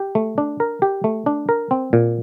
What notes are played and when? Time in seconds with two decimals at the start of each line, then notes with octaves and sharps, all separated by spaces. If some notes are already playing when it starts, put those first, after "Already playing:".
Already playing: G4
0.15 A3
0.38 D4
0.60 A#4
0.82 G4
1.04 A3
1.26 D4
1.49 A#4
1.71 C4
1.93 A#2